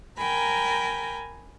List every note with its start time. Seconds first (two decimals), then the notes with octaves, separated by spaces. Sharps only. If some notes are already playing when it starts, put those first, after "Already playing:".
0.17 A#4 G5 G#5 A#5 B5